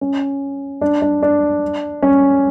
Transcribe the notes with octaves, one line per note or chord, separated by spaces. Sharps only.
C#4
D4
D4
D4
C#4